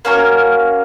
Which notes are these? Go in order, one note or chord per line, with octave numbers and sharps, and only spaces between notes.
A#3 C#4 F#4 A#4